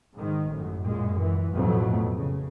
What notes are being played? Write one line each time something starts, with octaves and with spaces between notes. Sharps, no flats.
G#2 D#3
A1 F#2
F#2 A#2 G#3
E3
A1 F2 B2 F#3 A3
C#3